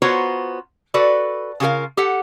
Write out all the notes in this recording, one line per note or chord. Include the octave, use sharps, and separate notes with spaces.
B3 F4 F#4 C5 C#5 A#5
F#4 A4 B4 D5
C#3 F4 G4 A#4 F5
G4 A4 F#5